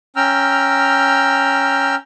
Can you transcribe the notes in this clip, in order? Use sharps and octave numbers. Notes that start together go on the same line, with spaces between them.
C#4 G5 A#5 E6 F6